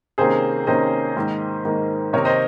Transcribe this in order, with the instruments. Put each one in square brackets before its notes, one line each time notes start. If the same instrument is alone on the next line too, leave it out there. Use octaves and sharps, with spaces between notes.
[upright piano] C3 D#3 A#3 C#4 G#4 C5
C3 D#3 A#3 C#4 C5 D#5
G#2 D#3 A#3
G#2 D#3 A#3
C3 D#3 A#3 D#4 A#4 C#5
C5 D#5